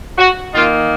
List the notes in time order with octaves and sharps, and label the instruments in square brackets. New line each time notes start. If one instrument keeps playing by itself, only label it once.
[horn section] F#4
D#3 A#3 F4